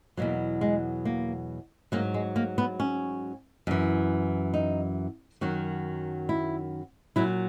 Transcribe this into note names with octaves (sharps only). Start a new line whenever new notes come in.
E2 B2 F#3 A#3
G#3
A#3
G#2 F#3 A#3
G#3
A#3
B3
C#4
F#2 E3
D#4
F#2 D#3 F#3 F#4
E4
A#2 F#3 E4